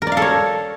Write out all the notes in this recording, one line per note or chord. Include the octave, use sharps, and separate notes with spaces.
A#4
D5
F5
A4
C#5